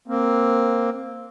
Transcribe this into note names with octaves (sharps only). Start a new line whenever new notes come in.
A#3 C4